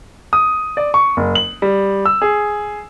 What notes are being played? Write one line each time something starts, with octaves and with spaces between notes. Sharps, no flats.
D#6
D5
C#6
F#1
F#7
G3
E6
G#4